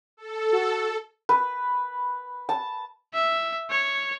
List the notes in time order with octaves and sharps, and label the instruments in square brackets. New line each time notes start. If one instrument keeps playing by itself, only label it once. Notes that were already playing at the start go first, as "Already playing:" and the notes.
[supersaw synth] A4
[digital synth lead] F#4
[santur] B4
A5
[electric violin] E5
C#5